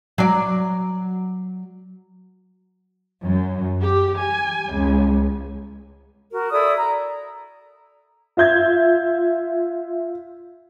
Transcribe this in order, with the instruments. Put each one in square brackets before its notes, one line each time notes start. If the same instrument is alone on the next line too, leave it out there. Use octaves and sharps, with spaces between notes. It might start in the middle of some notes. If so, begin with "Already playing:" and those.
[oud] F#3 D5
[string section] F#2
G4
G#5
C#2
[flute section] F#4 A#4
E4 A4 D5 D#6
A#5
[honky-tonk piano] F4 E5 G6 G#6